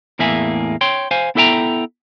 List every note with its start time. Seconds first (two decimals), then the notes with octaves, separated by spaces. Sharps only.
0.19 E2 A2 A#3 G#4 E5 G#5
0.81 C#5 G5 C6
1.11 C5 F5 G#5
1.35 B3 E4 A4 E5 G5 A#5